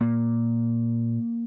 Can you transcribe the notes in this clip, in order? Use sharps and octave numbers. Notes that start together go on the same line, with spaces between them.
A#2 A#3